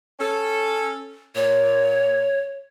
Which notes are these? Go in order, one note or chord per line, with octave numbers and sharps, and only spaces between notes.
C#4 A4
A#2 C#5